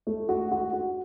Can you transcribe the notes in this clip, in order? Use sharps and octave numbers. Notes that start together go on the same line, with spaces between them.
A3
F#4
F#4
F#4